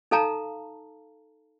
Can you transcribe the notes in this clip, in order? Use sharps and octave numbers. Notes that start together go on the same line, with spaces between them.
D#4 A4 F5 A5 A#5